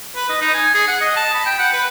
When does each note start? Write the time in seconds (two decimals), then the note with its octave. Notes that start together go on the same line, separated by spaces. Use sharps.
0.16 B4
0.29 D#5
0.41 D#4
0.54 G#5
0.74 G#4
0.88 F#5
1.01 D#5
1.16 A5
1.34 B5
1.46 G5
1.59 F#5
1.73 B4